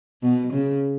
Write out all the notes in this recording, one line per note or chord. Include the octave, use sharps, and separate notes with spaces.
B2
C#3